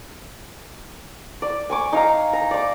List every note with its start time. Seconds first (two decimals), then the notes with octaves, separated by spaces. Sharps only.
1.42 D5
1.70 G#5 C#6 D6
1.93 D#4 F5 A#5
2.33 A#5
2.51 D5 D6